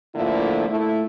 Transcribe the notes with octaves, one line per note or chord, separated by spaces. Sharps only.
A2 D3 F3 A#3 E4 F4
A3 E4